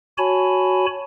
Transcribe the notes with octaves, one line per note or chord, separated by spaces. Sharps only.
F#4 C#5 G#5 A5 B5